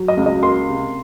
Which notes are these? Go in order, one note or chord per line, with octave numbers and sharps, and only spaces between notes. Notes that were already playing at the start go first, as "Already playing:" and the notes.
Already playing: F#3
D#5
C#2
D#5
A#3 C6
C3